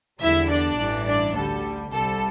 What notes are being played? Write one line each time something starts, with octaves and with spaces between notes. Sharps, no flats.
E2 D3 G3 E4 E5
D4 D5
A1 G2 E3
D4 D5
D2 D3 G3 A4
C2 C3 G3 A4